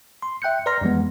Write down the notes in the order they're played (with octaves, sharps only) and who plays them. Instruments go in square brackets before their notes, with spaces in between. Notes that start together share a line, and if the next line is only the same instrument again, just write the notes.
[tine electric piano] C6
E5 G5 F#6 G6 C#7
B4 D5 A#5 C6 F6 A#6
F2 E3 G3 G#3 B3